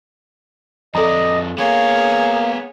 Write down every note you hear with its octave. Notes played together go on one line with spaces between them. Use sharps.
F2 A4 D5 D#5 A#5
A#3 B3 G#4 C#5 F5